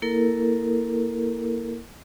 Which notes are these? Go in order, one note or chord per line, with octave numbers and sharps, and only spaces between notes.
A#3 E4 A4 A#4